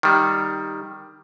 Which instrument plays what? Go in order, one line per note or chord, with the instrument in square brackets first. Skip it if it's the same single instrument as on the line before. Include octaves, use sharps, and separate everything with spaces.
[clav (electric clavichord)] D#3 G3